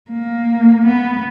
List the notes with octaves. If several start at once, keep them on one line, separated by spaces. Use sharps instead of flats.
A#3
B3